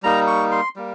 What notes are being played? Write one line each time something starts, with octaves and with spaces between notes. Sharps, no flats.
G3 A#3 D#4 A#5
C#6
C6
G3 A#3